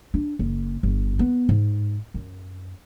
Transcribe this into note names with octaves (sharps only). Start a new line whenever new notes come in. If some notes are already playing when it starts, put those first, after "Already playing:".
D4
F#1
G1
B3
G#2
F#2